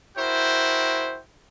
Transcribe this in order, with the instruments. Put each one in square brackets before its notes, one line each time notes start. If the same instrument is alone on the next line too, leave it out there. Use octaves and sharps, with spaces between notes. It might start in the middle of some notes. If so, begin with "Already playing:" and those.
[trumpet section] E4 F#4 A#4 C5 G5